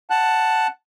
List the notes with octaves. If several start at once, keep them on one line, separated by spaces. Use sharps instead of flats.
F#5 A5 F#6